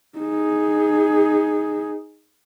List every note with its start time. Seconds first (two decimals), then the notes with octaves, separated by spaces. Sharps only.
0.18 D#4 G#4